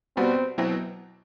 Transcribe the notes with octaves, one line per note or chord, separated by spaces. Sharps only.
B2 G3 B3 C4 F#4
B2 F#3 C4 E4